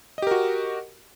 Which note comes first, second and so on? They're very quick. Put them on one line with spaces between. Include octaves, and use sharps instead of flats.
D#5 G4 A#4 F#4